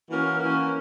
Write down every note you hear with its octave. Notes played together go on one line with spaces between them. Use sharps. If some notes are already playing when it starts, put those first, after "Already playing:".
E3 A#3 C#4 F#4 A#4
E3 A#3 C#4 F#4 A#4